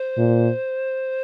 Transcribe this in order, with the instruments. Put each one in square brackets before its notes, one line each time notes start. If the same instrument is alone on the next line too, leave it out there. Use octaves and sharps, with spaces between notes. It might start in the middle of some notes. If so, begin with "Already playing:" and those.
Already playing: [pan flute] C5
[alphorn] A#2